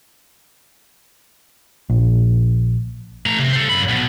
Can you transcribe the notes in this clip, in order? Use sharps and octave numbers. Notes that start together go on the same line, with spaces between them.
A#1
A3 A#5
C3
A4 C5
F#2 B5
B1 B2